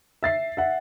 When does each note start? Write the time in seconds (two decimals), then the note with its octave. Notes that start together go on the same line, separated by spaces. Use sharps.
0.23 E5 A6 C7
0.57 E5 F#5